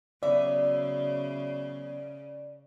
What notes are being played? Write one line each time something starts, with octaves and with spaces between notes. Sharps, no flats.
C#3 F#3 B3 D5 E5